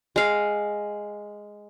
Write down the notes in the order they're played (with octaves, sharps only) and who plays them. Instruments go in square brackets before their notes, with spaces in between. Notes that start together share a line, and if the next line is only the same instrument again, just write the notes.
[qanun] G#3 F5